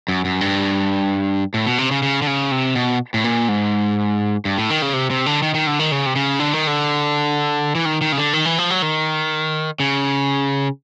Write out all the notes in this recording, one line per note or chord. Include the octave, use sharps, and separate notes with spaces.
F#2
F#2
G2
A2
B2
C3
C#3
C#3
D3
C#3
C3
B2
A2
A#2
G#2
G2
A2
D#3
C#3
C3
C3
D3
D#3
D#3
D3
D#3
C#3
C3
C#3
D3
D#3
D3
E3
D#3
D#3
C#3
D3
D#3
E3
F3
F#3
D#3
C#3